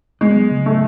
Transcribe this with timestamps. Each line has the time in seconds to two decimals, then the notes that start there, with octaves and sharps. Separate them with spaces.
0.21 G#3 B3
0.36 F#3
0.51 C#3
0.65 A3 D4